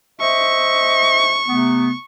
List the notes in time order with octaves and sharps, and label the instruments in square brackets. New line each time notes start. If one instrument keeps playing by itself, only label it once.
[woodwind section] C5 D#5 E5 [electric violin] C#6
[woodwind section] C3 A3 B3